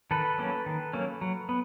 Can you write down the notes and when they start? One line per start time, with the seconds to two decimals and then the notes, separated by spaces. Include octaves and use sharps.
0.11 D#3 A4 B4
0.38 F#3 A#3 C#4
0.66 D#3
0.93 F#3 A#3 C#4
1.21 F#3
1.49 B3